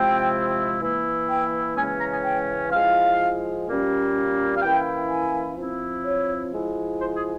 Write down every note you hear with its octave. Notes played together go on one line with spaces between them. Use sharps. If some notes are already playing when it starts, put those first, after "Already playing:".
Already playing: C3 F3 G#3 C4 E4 G5
E3 A#3 E4
G5
C#3 E3 G#3 C#4 G#5
A#5
G#5
G5
F3 G#3 E4 F5
A#2 G3 A#3 C#4
F5
E3 A#3 C#4 E4 G5
G#5
F3 C4 E4
C#5
F3 G#3 E4
C5
G#4